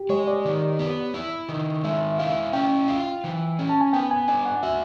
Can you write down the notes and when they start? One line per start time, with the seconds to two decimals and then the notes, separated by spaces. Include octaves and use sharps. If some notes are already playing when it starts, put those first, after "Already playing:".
Already playing: G4
0.09 G#3 C#5
0.28 D5
0.45 D#3
0.79 B3
1.14 E4
1.49 D#3
1.84 G#3 E5
2.18 E4 F5
2.53 C#4 G5
2.88 F4
3.24 E3
3.59 C#4
3.69 A5
3.81 G#5
3.93 B3 G5
4.11 G#5
4.28 D4 G#5
4.45 F#5
4.63 F#4 E5